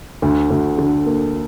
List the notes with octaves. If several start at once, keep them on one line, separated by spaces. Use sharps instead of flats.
D2
D2
D3
A#3